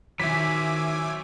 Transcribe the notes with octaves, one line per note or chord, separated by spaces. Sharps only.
D#3 F#3 C5 E5 G#5 D6 B6